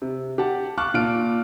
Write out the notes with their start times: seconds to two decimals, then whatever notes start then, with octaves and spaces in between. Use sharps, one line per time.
0.02 C3
0.38 G4 F#5 A5
0.78 F5 A5 C#6 D6 F6 F#6
0.94 A#2 F4 F6 D7